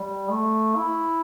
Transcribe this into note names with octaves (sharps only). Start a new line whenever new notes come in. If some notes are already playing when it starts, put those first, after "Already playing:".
Already playing: G3
A3
E4